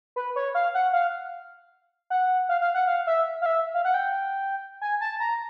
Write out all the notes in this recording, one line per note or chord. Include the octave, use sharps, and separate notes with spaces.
B4
C#5
F5
F#5
F5
F#5
F5
F5
F#5
F5
E5
F5
E5
F5
F#5
G5
G#5
A5
A#5